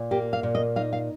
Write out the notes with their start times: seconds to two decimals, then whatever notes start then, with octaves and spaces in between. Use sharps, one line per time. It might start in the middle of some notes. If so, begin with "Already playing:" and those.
Already playing: A#2
0.11 A#3 G4
0.33 F5
0.43 A#2
0.55 D#5
0.76 D#4 F5
0.93 F5